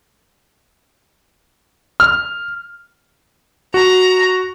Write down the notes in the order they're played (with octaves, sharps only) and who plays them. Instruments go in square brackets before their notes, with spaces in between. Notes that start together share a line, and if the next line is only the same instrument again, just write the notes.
[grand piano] F6
[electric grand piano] F#4 [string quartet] A#5